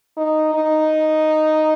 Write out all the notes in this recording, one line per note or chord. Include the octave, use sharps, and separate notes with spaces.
D#4
D#4